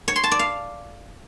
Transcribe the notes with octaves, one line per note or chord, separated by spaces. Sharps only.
C#5
C6
A5
D5
F5